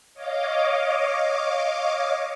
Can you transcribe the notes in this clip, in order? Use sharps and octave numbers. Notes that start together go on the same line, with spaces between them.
C#5 D#5 F5 D6